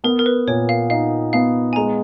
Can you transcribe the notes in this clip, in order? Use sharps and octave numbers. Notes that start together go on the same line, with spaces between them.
B3 A#4
A#4
B4
A#2 C#5
F5
D#4 F5
B3 F5
G#5
G#3 A#5